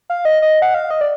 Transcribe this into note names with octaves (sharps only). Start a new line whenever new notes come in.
F5
D#5
D#5
F#5
F5
D#5
D5